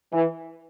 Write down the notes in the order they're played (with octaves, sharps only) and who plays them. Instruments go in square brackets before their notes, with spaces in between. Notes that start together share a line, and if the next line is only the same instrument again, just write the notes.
[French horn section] E3